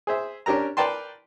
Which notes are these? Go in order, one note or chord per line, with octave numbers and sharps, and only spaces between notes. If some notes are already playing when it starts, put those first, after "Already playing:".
G#4 C5 E5
C#4 D4 G4 A#4 A#5
A#4 B4 D5 G5 A5 C6